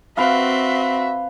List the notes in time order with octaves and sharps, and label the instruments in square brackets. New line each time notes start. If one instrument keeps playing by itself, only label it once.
[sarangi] C4 [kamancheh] F#4 E5 [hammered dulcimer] B4 F5